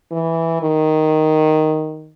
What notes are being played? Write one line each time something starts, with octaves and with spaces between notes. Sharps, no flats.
E3
D#3